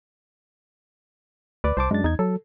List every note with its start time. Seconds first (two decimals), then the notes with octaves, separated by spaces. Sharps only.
1.64 D2 B4 D5 D6
1.77 C2 C5 A5 D6
1.91 F#2 G#3 D4 A6
2.04 E2 D#4 G#6
2.19 F#3 A4